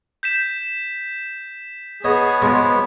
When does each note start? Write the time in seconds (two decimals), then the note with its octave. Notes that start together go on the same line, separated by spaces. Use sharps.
0.23 G6 B6 E7
2.04 B3 G#4 C#5 D#5
2.42 B2 F3 G#3